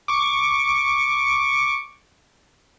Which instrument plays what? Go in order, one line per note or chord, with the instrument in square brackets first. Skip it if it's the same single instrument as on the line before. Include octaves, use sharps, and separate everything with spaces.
[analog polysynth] C#6 D6